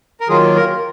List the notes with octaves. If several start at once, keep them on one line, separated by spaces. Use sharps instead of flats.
A#4
D#3 F#3 A#3 F4 G#4
A#4